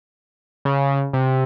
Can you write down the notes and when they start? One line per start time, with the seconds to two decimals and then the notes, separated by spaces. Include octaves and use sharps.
0.65 C#3
1.13 C3